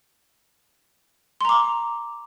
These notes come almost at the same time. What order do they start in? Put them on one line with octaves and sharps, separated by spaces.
C6 A#5 D6